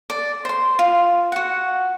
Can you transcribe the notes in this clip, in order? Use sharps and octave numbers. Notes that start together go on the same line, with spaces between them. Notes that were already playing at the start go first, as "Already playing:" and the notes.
D5
C5 C6
F4
F#4 F#5